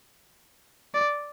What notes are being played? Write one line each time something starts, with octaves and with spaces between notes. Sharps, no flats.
D5